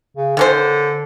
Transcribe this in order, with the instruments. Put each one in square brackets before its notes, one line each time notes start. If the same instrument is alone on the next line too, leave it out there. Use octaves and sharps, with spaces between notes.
[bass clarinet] C#3
[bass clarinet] D3 [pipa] D#3 C#4 C5